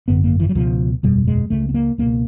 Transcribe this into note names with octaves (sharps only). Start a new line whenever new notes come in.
G#1 F#2 D3 B3
A#3
E3
F#3
C#2 B2 F3
F#1 E2 B2 G3
G#3
C#2 C#3 A3
B3
A#3
C#2 B2 A#3